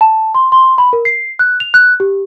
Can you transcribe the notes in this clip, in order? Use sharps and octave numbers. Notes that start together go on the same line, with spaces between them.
A5
C6
C6
B5
A#4
C7
F#6
F7
F#6
G4